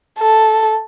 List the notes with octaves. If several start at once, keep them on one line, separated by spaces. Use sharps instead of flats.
A4